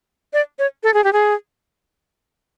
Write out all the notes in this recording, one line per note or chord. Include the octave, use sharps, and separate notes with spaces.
D5
C#5
A4
G#4
G4
G#4